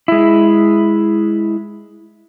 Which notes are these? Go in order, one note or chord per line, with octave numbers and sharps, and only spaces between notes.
G#3 E4